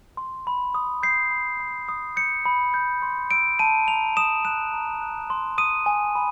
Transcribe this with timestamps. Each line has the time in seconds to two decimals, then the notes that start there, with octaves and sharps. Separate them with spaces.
0.17 C6
0.47 B5
0.75 D#6
1.03 G6 C7
1.31 B5
1.60 B5
1.88 D#6
2.16 G6 C#7
2.46 B5
2.74 G6
3.02 C6
3.31 E6 D7
3.59 A5 D#7
3.88 A#5 F7
4.17 D#6 E7
4.45 F#6 E7
4.73 A#5
5.01 F#6
5.30 C6
5.58 D#6 D#7
5.86 G#5
6.15 B5